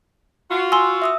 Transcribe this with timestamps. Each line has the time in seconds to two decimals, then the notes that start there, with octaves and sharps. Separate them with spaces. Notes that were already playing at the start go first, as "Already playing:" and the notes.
0.50 F4 F#4
0.72 G#5 C6 E6 G7
1.02 E5 D#6 E6